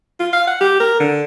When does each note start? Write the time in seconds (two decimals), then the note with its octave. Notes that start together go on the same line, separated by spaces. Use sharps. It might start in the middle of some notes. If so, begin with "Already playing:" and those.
0.20 F4
0.33 F5
0.47 F#5
0.61 G4
0.80 A#4
1.00 D3